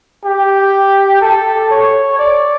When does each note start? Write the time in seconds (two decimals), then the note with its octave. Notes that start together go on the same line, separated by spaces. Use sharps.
0.25 G4
1.21 A4
1.71 C#5
2.19 D5